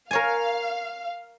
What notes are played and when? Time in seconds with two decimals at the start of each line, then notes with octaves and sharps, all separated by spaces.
0.11 A#4 C#5 F5 G#5